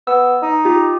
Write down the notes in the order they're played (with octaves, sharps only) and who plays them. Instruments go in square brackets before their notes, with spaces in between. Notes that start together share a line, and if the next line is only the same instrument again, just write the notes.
[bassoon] B3 [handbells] E6
[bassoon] D#4
[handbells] F4 G4